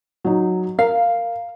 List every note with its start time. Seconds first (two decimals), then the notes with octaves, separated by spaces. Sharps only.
0.25 F#3 D#4
0.79 A#4 F5